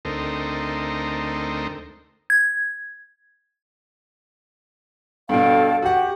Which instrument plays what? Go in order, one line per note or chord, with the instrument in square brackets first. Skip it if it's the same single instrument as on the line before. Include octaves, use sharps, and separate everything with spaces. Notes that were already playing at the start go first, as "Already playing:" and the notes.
[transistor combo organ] D2 A3 C4 D#4 A#4
[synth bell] G#6
[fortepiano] G2 B2 [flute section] A4 F5 G5
[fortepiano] F#4 F#5 [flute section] G4